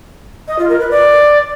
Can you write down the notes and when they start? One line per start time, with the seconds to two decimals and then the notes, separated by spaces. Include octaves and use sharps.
0.48 D#5
0.59 F4
0.69 A#4
0.80 B4
0.91 D5